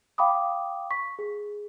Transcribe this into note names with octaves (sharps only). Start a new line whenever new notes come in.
F5 G5 B5 D6 D#6
C#6 B6
G#4